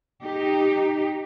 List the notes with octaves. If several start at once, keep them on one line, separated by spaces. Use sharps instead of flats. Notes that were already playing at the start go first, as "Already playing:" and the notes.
D#4 G4